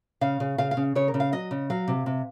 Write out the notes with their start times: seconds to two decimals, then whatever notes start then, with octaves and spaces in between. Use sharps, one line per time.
0.21 C#3 F5
0.40 C#3
0.58 C#3 F5
0.71 F5
0.77 C#3
0.95 C#3 C#5
1.08 A#4
1.14 C#3
1.20 F5
1.32 F#3 D#5
1.51 C#3
1.70 F#3 F5
1.88 C3
2.06 C3